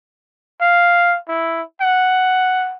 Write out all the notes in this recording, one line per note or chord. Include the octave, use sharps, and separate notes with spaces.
F5
E4
F#5